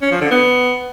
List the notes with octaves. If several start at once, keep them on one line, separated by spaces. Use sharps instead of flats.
C#4
F3
D3
B3